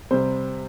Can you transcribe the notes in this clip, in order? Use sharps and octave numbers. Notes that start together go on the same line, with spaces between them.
C3 G3 C5